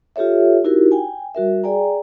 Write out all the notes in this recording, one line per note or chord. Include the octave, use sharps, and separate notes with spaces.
F4 G4 A4 C#5 E5
D#4 E4 F#4 G4 A#4
G5 G#5
G3 F#4 A#4 E5
G#4 D5 G5 G#5 A#5